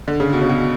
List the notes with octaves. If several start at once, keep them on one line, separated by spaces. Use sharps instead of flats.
D3
C#3
B2
C#3
B2